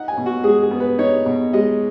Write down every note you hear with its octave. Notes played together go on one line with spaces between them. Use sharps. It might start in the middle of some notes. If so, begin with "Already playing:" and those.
Already playing: D#4 F#5
G#5
B2
F#4
G#3 G#4
G#4
B3
B4
D#4 C#5
B2
G#3 D#5